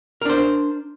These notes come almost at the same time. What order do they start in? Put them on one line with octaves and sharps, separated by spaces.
A#4 D4 C5